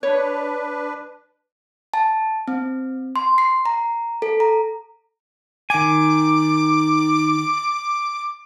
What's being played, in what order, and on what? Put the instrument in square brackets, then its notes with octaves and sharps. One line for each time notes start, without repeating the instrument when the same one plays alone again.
[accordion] D4 B4 [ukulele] C#5
[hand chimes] A5
C4
C6
C7
A#5
A4
A#5
[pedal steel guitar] D#3 G#5 [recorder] D6